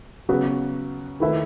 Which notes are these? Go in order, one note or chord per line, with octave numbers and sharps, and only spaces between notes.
C#3 F#3 B3 F#4 B4
D#3 A3 E4 B4 E5